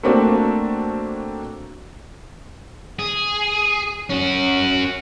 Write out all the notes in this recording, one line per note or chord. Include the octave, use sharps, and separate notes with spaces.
A3 A#3 C4 D4 F#4
G#4
C#4 F#4